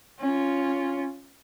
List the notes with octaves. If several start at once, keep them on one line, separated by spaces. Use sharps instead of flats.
C#4 F4